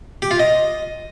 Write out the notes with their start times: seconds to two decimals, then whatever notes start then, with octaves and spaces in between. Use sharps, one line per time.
0.22 G4
0.31 F4
0.39 D#5